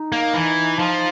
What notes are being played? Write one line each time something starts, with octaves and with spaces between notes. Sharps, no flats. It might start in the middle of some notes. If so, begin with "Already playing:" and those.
Already playing: D#4
A#3
E3
F3